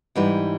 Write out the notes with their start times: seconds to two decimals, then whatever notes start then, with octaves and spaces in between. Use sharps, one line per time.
0.15 G#2 E3 G3